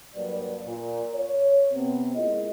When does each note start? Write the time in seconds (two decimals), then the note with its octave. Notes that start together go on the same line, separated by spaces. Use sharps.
0.15 G2 F#3 A#3 B4 D5
0.66 A#2
1.14 C#5
1.72 C3 B3 C4
2.14 G#3 A#3 E4 F4 G#4 D#5